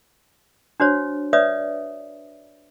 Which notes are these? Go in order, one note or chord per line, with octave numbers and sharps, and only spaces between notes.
D4 F#4 C5 C#5
B4 C#5 D5 E5 D#6